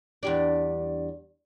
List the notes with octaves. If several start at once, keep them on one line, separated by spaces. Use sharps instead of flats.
E2 G3 D4